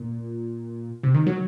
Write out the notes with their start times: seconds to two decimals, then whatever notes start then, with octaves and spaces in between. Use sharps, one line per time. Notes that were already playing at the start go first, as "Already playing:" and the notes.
Already playing: A#2
1.03 C3
1.14 D#3
1.26 F#3